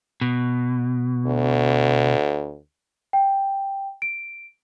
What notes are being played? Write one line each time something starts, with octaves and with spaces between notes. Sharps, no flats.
B2
D2
G5
D7